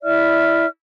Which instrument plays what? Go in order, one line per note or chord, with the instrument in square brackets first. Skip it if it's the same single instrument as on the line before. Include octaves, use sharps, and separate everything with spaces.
[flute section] E4 D5 E5 F6